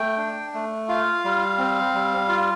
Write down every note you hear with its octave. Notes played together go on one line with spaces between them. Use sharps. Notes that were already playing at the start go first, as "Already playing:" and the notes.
Already playing: A3 G5
D4
A3
F4 F5
G3
C4
G3
F4